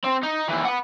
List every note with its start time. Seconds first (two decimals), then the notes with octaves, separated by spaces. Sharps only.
0.04 C4
0.23 D#4
0.48 D#2 E3
0.65 F#5 B5